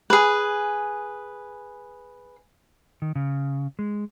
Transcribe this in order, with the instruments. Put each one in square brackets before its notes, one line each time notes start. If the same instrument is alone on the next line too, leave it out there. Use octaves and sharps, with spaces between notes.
[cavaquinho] G#4 B4
[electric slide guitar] D#3
C#3
G#3